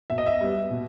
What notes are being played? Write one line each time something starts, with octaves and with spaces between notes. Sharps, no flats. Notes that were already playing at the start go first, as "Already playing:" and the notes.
B2 E5
D#5
E5
G3 B3
B2